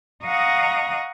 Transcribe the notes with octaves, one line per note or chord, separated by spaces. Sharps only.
D#5 F5 F#5 A#5 C#6 D#6